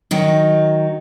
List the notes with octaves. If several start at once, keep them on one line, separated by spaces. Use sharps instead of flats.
D#3 F#3 D#4